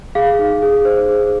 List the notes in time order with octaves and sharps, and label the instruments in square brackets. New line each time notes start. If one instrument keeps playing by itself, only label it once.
[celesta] G#4 F5
D#4
G#4
C5
G#4